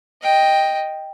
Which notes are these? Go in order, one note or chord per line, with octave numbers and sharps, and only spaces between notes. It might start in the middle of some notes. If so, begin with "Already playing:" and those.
D#5 G5